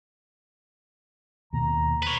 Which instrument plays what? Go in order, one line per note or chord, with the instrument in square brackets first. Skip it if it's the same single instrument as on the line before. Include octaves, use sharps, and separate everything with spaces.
[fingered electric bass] D#2 B2 A#3 [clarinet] A#5
[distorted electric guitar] B4 C#5